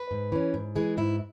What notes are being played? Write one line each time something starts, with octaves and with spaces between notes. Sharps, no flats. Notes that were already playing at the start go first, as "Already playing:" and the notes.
Already playing: B4
G#2
E3 C#4
G#2
E3 G#3 G#4
G#2 E4